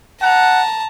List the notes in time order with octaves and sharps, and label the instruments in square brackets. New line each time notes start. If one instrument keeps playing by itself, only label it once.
[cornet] F#5 [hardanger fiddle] A5 A#5